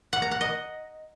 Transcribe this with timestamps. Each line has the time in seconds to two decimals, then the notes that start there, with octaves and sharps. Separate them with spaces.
0.13 F#5
0.22 A#5
0.31 F#5
0.41 D#5